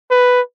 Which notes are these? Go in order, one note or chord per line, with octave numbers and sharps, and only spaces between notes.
B4